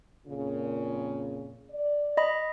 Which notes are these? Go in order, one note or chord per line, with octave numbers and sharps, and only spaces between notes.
F2 A#2 C#3
D5
D#5 B5